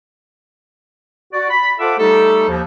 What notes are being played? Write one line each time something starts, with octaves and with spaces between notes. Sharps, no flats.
F#4 D5
B5
F4 A4 C5 E5 F#5 D6
G3 A3 D#4 G4 A4
D#2 F3